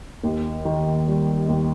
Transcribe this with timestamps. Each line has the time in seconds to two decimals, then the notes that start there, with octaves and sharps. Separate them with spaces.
0.23 D#2
0.65 D#3
1.07 G3
1.48 D#2